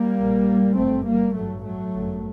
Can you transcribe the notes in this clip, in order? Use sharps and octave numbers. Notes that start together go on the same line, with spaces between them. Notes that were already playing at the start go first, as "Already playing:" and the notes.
Already playing: G3 A#3
A#1 A#2
G1 F#2 A3 C4
G3 A#3
A1 G2 F#3 A3
F#3 A3
G1 F#2